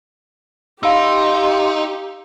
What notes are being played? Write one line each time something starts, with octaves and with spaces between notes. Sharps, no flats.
D#4 G4 F5 C6 E6